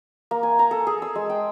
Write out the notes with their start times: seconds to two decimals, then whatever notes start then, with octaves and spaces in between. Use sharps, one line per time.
0.31 A#3
0.43 G#5
0.59 A#5
0.71 A4
0.87 G#4
1.02 E6
1.15 G#3
1.30 G5